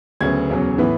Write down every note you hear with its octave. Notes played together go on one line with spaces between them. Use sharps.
D2 C#3 F#3 B3 G#6
E1 E2 C#3 F#3 C#4
A2 E3 B3